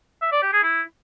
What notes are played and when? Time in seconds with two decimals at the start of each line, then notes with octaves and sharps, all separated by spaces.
0.22 E5
0.32 D5
0.42 G4
0.53 G#4
0.63 E4